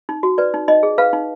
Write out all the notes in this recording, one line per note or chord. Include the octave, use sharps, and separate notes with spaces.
D#4
F#4
B4 D5
D#4
D#4 D#5
G#4
B4 F5
D#4